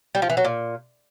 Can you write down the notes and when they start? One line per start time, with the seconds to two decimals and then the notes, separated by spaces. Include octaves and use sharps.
0.15 G3
0.22 F3
0.30 E3
0.37 F#3
0.45 A#2